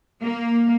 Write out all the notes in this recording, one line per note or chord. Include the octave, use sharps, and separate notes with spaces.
A#3